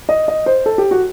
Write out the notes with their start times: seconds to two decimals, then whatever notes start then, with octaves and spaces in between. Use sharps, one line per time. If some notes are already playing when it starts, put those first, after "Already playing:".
0.09 D#5
0.28 D#5
0.46 C5
0.66 A4
0.78 G4
0.91 F#4